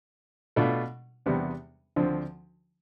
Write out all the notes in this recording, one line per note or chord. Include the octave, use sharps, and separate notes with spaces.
B2 A3 D4 F4
E2 C3 G3 B3 D4
D2 D3 F3 C4